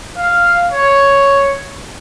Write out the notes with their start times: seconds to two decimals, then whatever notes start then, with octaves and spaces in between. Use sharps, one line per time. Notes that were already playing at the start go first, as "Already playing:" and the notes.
0.17 F5
0.71 C#5